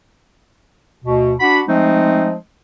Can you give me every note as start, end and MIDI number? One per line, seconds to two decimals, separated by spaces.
1.04 1.33 38
1.04 1.33 47
1.39 1.60 62
1.39 1.60 66
1.39 1.60 78
1.39 1.60 83
1.67 2.34 53
1.67 2.34 56
1.67 2.34 57
1.67 2.34 60
1.67 2.34 63